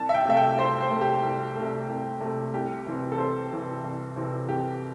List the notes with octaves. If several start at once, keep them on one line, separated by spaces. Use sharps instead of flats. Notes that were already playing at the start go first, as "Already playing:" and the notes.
Already playing: C2 A5
E5
G5
C3 A3 E5
G5
C2 C5
C5
C3 A3
G4
C2
C3 A3
C2
C3 A3
C2 G4
C3 E3 C4
A4
C2 C5
C3 E3 C4
C2
C3 E3 C4
C2 G4